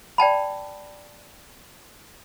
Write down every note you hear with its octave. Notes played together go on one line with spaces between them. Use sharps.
D5 G5 A5 B5